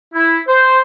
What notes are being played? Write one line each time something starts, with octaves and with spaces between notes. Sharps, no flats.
E4
C5